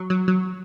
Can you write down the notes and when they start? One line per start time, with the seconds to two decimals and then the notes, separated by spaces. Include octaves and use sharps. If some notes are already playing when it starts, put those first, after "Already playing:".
Already playing: F#3
0.10 F#3
0.28 F#3